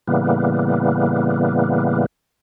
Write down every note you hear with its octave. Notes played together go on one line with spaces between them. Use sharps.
A2 C#3 E3 G3 A#3 B3